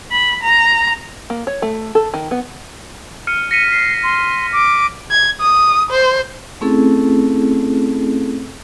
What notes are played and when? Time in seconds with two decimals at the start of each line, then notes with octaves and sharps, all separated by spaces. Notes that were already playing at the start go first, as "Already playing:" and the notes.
0.12 B5
0.43 A#5
1.30 A#3
1.47 C#5
1.62 A3
1.95 A4
2.14 D#3
2.31 B3
3.27 F6 C#7 D#7
3.51 A#6 B6 C#7 D#7
3.71 C7
4.03 C6
4.52 D6
5.11 G#6
5.41 D#6
5.91 C5
6.61 A3 C4 C#4 E4 G#4 A4